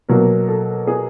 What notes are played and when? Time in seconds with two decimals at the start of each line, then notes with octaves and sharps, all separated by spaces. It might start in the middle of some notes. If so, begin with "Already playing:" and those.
0.09 B2 F#3 A#3 A#4
0.48 A4
0.87 G#4